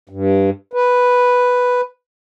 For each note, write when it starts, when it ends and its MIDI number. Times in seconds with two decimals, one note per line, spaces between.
0.09 0.50 43
0.73 1.81 71